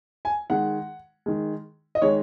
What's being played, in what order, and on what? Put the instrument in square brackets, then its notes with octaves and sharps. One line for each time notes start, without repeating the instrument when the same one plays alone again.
[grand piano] G#5
D#3 G#3 F#5
D#3 G#3
D#5
D#3 G#3 C#5